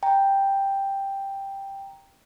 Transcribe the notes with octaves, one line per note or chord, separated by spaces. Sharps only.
G5 A#5